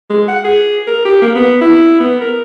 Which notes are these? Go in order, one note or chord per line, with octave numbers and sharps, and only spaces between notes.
G#3
F#5
G#4
A#4
G4
A#3
B3
E4
B3
A#4